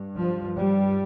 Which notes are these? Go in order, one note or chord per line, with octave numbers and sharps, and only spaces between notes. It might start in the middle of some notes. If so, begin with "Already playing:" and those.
Already playing: G2
F3
G3